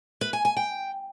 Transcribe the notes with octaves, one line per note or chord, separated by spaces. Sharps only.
B4
G#5
G#5
G5